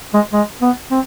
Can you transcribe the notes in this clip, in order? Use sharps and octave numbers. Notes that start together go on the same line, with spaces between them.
G#3
G#3
B3
C4